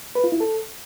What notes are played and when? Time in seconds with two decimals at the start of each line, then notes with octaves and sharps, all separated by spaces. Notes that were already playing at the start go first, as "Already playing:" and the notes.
0.15 B4
0.24 F4
0.32 E4
0.40 A4